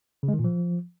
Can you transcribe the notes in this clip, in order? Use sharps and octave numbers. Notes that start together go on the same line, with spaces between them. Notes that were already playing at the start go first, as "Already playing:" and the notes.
C#3
G#3
D#3
A#2
F3